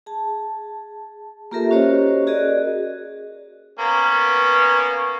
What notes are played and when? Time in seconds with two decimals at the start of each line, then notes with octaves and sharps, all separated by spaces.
0.06 G#4 A5
1.51 A#3 F4 G4 A4 A#4 E5
1.71 C#4 F#4 G4 C5 C#5 D#5
2.27 F#4 G#4 A#4 D5 D#5
3.79 A#3 B3 C#4